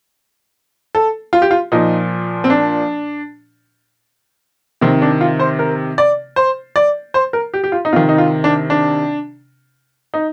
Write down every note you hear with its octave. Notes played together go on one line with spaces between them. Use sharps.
A4
F4
G4
F4
A#2 F3 D#4
C4
D4
C3 D#3 C4
D4
F4
C5
A#4
D5
C5
D5
C5
A#4
G4
G4
F4
D#4
C3 D#3 F4
D#4
F4
D4
D4
D#4